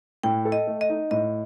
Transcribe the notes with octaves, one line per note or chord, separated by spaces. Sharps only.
A2 G5
A4
D#5
A3
D#5
D#4
A2 D#5